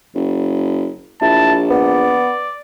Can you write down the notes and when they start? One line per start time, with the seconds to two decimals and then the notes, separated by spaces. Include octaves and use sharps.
0.15 F#1
1.22 A#1 E4 A5
1.70 B3 D5